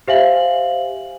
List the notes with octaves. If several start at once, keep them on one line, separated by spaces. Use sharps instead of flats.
G4 C5 E5 F5 G#5 F#7